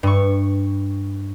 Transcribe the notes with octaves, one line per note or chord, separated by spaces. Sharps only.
G2 C#6